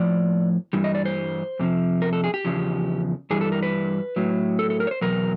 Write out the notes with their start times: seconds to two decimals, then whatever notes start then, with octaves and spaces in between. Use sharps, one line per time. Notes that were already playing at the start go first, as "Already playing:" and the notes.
Already playing: A2 F3 D5
0.73 G2 E3 G3
0.84 D#5
0.95 D5
1.05 C5
1.59 F2 C3 F3
2.02 A#4
2.13 A4
2.24 G#4
2.34 G4
2.45 E2 C#3 F3
3.30 G2 E3 G3 G#4
3.41 A4
3.52 A#4
3.63 B4
4.16 A2 F#3
4.59 A4
4.70 A4
4.80 A#4
4.87 C#5
4.91 C5
5.01 E2 B2 F#3 A#4